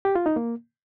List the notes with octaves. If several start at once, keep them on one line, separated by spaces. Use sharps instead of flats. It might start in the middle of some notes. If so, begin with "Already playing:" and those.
G4
F4
D#4
A#3